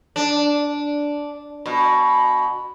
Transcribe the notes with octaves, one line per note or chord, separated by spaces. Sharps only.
D4
B2